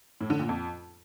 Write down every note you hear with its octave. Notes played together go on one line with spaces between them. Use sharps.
A2
D3
A#2
F2